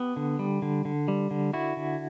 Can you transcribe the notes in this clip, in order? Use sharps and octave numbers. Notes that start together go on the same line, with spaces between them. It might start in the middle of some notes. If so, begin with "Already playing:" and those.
Already playing: B3 G4
D3
G3
D3
D3
G3
D3
D3 E4 F#4
D3